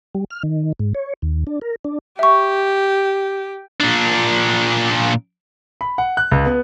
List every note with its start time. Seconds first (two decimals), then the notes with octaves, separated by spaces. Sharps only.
0.15 G3
0.30 F6
0.43 D#3
0.79 G#2
0.95 C#5
1.22 D#2
1.47 D4
1.62 A#4
1.85 D4
2.19 G4 E5 C#6
3.80 A#2 D4
5.81 B5
5.98 F#5
6.17 F#6
6.31 C#2
6.46 B3